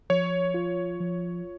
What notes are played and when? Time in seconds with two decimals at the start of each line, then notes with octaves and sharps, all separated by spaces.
0.10 F3 C#5
0.54 F4
1.00 F3